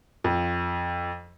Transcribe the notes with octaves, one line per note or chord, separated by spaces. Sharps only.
F2